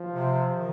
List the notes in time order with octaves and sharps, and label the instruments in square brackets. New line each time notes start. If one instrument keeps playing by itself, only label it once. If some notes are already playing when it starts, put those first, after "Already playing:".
Already playing: [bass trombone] F3
[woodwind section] C3
D#3